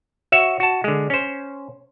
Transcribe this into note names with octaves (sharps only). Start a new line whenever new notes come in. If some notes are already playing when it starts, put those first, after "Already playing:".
F#4 C#5 E5
F#4 A5
D3 G#3
C#4 C5